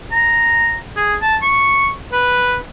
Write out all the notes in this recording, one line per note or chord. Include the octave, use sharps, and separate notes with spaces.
A#5
G#4
A5
C#6
B4